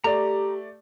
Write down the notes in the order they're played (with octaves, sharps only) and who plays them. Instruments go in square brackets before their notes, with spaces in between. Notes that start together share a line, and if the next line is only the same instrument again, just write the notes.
[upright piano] A3 D5 [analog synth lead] G4 [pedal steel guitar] A#5